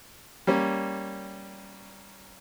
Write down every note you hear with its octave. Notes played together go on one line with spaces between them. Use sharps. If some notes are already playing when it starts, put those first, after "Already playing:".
G3 A#3 C#4